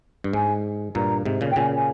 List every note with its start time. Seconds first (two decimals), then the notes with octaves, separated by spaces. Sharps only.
0.24 G2
0.33 G#2 G#5
0.95 G2 A#2 A#5
1.25 G#2 C3
1.41 A#2 C#3
1.51 G5
1.56 A#2 C#3 G#5
1.76 G#5